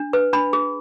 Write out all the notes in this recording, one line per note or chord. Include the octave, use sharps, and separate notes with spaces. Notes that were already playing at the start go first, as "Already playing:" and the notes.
Already playing: D4
B4
D4 B5
G#4